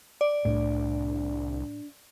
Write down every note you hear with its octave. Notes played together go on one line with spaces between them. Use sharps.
D5
C2 A2 D4